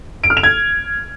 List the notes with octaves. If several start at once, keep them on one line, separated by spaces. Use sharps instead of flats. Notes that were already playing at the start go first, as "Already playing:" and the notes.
D7
F6
F7
G#6